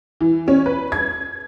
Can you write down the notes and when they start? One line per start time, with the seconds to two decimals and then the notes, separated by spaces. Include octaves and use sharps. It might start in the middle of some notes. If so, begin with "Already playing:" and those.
0.21 E3
0.48 C#4
0.66 B4
0.92 G#6